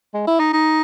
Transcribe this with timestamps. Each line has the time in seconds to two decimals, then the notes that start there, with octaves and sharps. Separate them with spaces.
0.14 G#3
0.27 E4
0.39 D#4
0.53 D#4